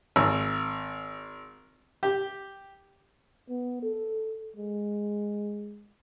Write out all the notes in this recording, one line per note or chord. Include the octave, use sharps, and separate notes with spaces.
G#1 E6
G4
B3
A4
G#3